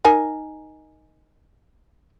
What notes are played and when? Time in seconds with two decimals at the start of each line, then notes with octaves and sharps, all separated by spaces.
0.05 D#4 A#4 G#5